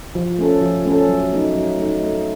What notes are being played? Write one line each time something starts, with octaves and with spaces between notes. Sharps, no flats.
F3
A3 C#4 A4
F3
A3 C#4 A4
F#3
A3 D#4
F#3
A3 D#4
A3